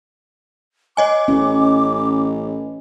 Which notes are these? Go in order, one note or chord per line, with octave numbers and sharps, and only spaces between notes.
C#5 D#5 G#5 D6
A1 C#4